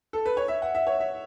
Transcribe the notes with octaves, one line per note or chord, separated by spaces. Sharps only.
A4
B4
C#5
E5
F#5
E5
C#5
E5